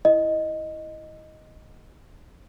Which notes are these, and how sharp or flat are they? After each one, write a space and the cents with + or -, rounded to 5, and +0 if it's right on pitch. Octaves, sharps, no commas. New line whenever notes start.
E4 +0 D#5 +0